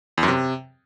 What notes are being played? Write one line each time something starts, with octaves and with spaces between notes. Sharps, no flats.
E2
F#2
C3